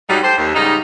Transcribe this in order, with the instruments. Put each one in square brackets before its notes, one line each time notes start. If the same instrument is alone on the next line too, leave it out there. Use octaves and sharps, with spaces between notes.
[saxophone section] G#2 F#3 G3 D#4
G4 A4 C5
D#2
G#2 C#3 G3 D#4